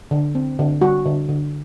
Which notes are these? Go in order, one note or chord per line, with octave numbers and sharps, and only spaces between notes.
D3
C4
D3
G3 F#4
D3
D3